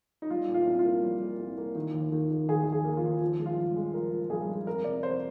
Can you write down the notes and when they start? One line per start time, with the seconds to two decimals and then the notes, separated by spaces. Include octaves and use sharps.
0.22 D#4
0.30 G3 F4
0.48 A#2
0.54 F4
0.67 C2
0.79 F4
0.85 A#3
1.03 G3
1.22 A#3
1.39 C2
1.57 A#3
1.75 D#3
1.94 D#2
2.12 D#3
2.31 D#3
2.48 D#2 G#4
2.67 D#2
2.72 G#4
2.85 A#3
2.97 F4
3.03 D#2
3.21 F3
3.39 G#3
3.46 F4
3.57 G2
3.76 G#3
3.94 F3 A#4
4.12 F3
4.30 G2 G#4
4.48 G#3
4.67 F2 A#4
4.84 C3 D5
5.03 F2 C5